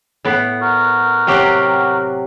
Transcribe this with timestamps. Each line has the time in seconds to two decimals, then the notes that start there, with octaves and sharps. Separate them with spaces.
0.25 A2 B3
0.61 F#4 A#4
1.27 C3 F#3 G4